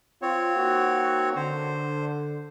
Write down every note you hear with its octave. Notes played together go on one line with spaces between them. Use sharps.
C4 F4 C#5
A#3 D#4 F#4
D3 C5